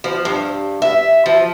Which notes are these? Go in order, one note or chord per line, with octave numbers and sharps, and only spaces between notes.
F3
G2
E5
F3